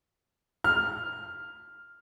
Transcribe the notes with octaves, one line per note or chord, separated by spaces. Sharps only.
F6